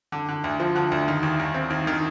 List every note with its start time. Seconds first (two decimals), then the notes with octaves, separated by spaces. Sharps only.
0.12 D3
0.28 D3
0.44 D2
0.60 F3
0.76 D3
0.92 D2
1.08 D#3
1.23 D#2
1.40 D#2
1.54 C4
1.70 D#2
1.87 D#3